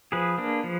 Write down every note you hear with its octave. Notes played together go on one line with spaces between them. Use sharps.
F3 G#4 B4
A#3 D4
F3